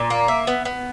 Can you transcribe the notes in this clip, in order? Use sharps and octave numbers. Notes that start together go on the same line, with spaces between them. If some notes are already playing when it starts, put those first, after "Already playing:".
Already playing: A#2
A#3
E5
B3
B3